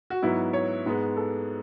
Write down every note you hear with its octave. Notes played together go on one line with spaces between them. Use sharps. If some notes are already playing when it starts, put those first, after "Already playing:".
F#4
G#2 F#3 B3 E4
C#5
G#2 G#3 B3
A4